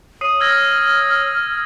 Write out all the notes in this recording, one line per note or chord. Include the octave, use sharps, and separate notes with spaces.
C#5 D#6 C7 D#7
E6 F6 G#6 A#6